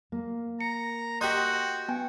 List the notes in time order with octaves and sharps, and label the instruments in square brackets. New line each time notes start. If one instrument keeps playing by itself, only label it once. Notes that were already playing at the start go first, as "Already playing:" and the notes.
[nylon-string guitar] A#3
[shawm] A#5 [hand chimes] C#7
[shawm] F#4 [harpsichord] G4 D#5 [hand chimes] C6 F#6 G6
[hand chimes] B3 G5 G#5